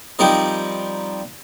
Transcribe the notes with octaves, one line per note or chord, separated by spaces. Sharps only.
F3 G3 C4 D#4 A#4 D#5